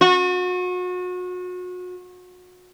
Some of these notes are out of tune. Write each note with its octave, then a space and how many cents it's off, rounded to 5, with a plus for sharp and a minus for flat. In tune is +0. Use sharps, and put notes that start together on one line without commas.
F#4 -35